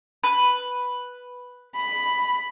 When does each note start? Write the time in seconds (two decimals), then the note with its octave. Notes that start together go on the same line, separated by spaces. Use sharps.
0.24 B4
1.75 B5